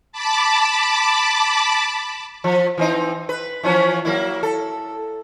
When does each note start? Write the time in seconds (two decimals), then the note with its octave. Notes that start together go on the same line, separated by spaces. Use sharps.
0.12 A5 B5 D6
2.44 F3
2.78 E3 C4 D#4
3.29 B4
3.63 E3 F3 C#4
4.05 F#3 A#3 E4
4.43 A4